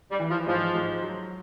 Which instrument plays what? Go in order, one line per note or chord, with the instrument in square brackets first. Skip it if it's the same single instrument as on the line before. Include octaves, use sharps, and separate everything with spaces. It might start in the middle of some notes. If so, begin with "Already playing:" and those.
[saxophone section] G3
[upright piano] E3
[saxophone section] F3
[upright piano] G#2 [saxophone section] F3
[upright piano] G#2
F#3